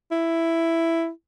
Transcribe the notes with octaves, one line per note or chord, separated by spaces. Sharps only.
E4